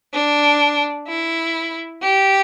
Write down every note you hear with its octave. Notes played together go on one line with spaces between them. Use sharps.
D4
E4
G4